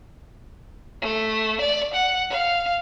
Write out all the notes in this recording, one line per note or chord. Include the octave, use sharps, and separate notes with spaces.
A3
D5
F#5
F5